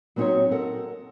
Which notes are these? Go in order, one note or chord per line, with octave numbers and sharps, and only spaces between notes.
F#3 B3 C4 D#4 G4 C#5
A4 A#4 F#5